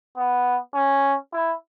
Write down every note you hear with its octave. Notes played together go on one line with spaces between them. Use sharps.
B3
C#4
E4